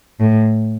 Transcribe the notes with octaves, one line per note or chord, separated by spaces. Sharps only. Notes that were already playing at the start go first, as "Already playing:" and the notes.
A2